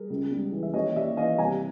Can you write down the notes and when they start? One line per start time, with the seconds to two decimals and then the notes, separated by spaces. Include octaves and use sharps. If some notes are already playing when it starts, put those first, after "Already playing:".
Already playing: G3 G#4 A#4
0.10 C#2
0.31 G3
0.52 E3
0.63 E5
0.74 D#2 C#5 D#5
0.95 D#2 D5 E5
1.17 E3 D#5 F5
1.38 C2 G#5 A#5